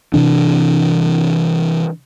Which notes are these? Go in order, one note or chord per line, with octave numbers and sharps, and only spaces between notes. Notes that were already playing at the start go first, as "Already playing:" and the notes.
C3 E3 D4